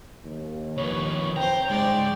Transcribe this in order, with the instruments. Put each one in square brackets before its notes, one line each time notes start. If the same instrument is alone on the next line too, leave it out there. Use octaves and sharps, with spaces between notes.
[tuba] D#2
[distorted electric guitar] F2 D#3 [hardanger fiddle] B4 [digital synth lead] C#5
[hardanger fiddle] C4 C5 [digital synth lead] G5 [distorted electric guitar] A#5
[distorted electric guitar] C#2 G#3 [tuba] G#2 [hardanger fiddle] D5